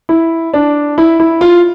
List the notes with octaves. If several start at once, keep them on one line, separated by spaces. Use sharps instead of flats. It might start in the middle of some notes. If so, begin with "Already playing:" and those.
E4
D4
E4
E4
F4